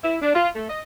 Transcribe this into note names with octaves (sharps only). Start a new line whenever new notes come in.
E4
D4
F4
A3
D#5